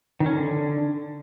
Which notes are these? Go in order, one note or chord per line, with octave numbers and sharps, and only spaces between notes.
D#3
C#4
D3